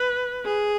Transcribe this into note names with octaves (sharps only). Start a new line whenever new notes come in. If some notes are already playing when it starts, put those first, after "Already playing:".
Already playing: B4
G#4